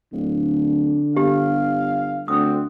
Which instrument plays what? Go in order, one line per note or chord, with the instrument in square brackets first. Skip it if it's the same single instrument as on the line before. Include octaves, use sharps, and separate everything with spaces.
[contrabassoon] D1 [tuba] D3
[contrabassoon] G1 [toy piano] G4 [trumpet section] F5
[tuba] D2 [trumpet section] C4 F#4 [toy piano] D#6